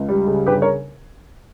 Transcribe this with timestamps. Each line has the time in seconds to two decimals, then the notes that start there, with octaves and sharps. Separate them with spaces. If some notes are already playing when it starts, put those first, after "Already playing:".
Already playing: C#2
0.08 G3
0.27 C#3
0.46 G1 G4 B4
0.62 A#4 C#5